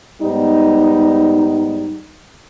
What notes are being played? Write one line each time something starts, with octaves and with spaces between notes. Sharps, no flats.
G#2 G3 B3 D#4